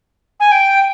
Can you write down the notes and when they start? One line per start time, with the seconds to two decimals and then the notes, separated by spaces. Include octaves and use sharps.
0.40 G#5
0.52 G5